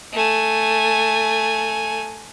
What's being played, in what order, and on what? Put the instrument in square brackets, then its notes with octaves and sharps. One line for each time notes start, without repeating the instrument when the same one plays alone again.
[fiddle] A3 G#5